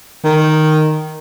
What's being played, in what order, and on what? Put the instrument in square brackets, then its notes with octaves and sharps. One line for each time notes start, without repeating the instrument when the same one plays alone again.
[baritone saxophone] D#3